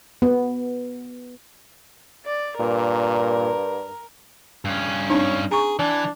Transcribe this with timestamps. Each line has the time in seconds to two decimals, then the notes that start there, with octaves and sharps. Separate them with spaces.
0.22 B3
2.25 D5
2.60 G2 A#2 A#4
4.65 G2 C#4
5.10 C4 D4 D#4 C#5
5.51 G#4 A#5 C#6
5.79 E3 D4